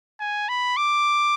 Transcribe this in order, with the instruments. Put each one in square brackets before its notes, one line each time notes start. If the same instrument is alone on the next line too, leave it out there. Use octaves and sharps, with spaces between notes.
[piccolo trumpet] G#5
B5
D6